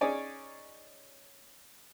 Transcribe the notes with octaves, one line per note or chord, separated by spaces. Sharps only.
C#4 D#4 G#4 C#5 D5 G#5